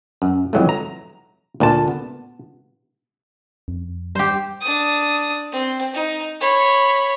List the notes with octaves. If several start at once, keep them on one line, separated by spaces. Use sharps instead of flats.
F#2
F2 E3 F#3 G#3 A3
A#5
D2 A#2 D3 A5
B3
F2
G3 G4 C5
D4 D#6
C4
D#4
C#5 B5